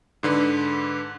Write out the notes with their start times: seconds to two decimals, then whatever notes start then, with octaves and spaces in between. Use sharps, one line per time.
0.23 G#2 D3 B4